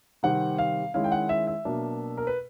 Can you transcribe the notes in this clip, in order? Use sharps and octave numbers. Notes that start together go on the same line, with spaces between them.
C3 D#3 G3 C4 D#4 F#5
F5
D#3 G#3 C#4 E4 F5
G5
F#5
E5
E5
B2 F#3 A#3 D4
A#4
B4